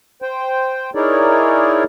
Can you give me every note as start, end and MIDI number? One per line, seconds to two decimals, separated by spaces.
0.22 0.90 72
0.22 0.90 79
0.95 1.84 63
0.95 1.84 64
0.95 1.84 68
0.95 1.84 70
0.95 1.84 73
0.95 1.84 74